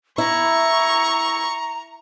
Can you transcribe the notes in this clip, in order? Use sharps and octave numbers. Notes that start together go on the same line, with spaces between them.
E4 A#5 C#6